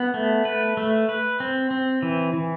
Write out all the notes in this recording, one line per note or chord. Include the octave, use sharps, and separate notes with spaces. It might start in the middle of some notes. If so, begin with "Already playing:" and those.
Already playing: B3
A3
B4
A3
B4
C4
C4
E3
E3